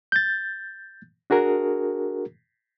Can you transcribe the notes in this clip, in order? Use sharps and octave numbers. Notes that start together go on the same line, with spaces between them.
G6 A6
D4 F#4 G#4 A#4